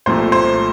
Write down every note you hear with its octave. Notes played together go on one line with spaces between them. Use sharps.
C2 A#2 F3 A3 C5
C5